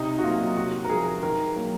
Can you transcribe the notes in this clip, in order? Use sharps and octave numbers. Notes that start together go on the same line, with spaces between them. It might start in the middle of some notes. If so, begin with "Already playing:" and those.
Already playing: C3 D#4
F#4
F#3 A#3 F4
C3 F#4
A#4
F3 G#3 G#4
D#3 A#4
F#3 A#3